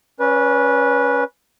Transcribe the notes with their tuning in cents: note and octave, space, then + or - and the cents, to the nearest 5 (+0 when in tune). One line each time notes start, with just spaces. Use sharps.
C#4 +0 B4 -20 D5 -35